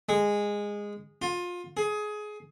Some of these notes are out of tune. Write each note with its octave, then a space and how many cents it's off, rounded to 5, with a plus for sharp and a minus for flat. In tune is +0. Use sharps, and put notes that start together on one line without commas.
G#3 -15
F4 +25
G#4 +20